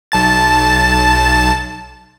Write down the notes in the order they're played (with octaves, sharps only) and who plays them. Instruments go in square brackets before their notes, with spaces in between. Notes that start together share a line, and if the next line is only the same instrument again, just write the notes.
[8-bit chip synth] B1 A5 A6